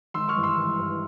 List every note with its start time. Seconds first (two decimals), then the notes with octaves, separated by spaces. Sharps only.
0.14 G#1 C6 E6
0.29 C#6 F6
0.36 G2 E3
0.43 C6 E6
0.57 G#1
0.79 G2 E3